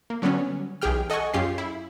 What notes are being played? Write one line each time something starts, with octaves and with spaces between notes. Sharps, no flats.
A#3
D3 F#3 G3 B3 C#4
B1 E3 G4 G#4 G5 F6
A4 D#5 F#5 G#5 C#6
F#2 C#4 F4 G4 G#4 C7
E4